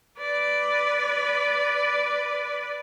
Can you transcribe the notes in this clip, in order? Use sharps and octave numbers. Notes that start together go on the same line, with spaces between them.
B4 D5